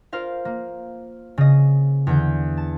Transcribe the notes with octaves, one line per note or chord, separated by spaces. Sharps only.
F4 A#4 C5 F5
A#3
C#3 D#5
E2 D3 G6
A5